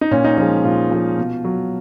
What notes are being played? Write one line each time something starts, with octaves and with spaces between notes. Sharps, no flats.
D#4
A#2 C#4
D#4
F3 G#3 C#4
A#2 F4
F3 G#3
B2
F#3